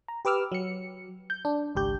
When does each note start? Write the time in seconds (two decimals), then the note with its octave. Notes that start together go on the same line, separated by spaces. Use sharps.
0.08 A#5
0.25 G4 B4 D6 E6 F6
0.52 F#3 C#7
1.30 G6
1.45 D4
1.75 G#1 C#2 G4 G6